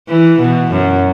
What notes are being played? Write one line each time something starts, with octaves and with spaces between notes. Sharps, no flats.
E3
B2
F#2